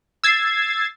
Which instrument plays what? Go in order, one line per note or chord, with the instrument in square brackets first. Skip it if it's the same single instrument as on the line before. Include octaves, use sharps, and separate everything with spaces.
[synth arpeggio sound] E6 G#6 A6 C7